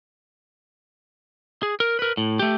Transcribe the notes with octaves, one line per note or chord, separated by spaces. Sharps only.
G#4
A#4
A#4 B4
A2
A3 G4